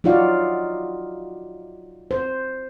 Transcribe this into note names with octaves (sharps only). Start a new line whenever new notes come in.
F#3 D#4 F4 F#4 D5 F5
C5